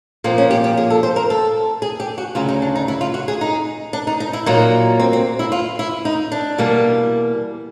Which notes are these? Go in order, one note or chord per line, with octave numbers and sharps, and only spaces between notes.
A#2 F3 A#3 C4
C#4
G4
G4
G#4
A4
C5
A#4
A4
G#4
G4
F#4
D2 C#3 F#3 F4
D#4
D4
D#4
E4
F4
F#4
G#4
D#4
D4
D#4
D#4
E4
A#2 F#3 A#3 D#4
C4
C4
E4
F4
E4
D#4
D4
E2 B2 G3 A#3